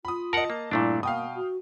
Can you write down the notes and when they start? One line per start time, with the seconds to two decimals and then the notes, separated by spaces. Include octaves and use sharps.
0.05 F4 B5 D#6
0.33 A#4 D#5 F#5 A5
0.50 A#3
0.71 G2 A#2 A3 D4 E4
1.03 B2 A#3 F5 G5 D#6
1.34 F#4